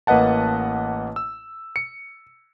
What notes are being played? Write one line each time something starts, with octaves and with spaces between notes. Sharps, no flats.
A1 A#3 B4 D#5 F#5 A5
E6
C#7